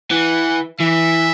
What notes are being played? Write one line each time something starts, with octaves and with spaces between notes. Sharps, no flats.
E3 F#5
E3 E5